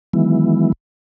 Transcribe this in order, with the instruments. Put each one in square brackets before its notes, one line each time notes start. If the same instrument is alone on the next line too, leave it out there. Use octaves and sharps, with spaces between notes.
[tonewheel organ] D#3 E3 F#3 G#3 B3 E4